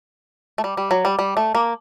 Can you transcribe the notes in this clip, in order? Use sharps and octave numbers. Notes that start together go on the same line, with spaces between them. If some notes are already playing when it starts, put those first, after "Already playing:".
A3
G3
G3
F#3
G3
G3
A3
A#3